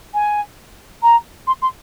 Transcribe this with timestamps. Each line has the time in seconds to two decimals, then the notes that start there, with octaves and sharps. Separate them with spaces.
0.14 G#5
1.03 A#5
1.47 C6
1.62 C6